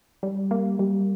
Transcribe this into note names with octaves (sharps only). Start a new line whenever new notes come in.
G3
A#3
G3